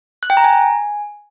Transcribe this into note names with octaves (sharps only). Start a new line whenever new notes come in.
F#6
G5
A#5
G#5